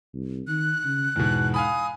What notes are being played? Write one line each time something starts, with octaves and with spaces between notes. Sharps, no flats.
C2
D#3 F#6
C#3
E2 G#2 B2
F5 G#5 B5 D#6